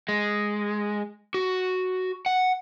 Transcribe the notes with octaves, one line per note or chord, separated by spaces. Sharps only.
G#3
F#4
F#5